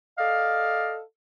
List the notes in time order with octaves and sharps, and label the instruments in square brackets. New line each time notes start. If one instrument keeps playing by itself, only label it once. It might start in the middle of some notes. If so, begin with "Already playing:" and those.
[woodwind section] A4 D5 D#5 F5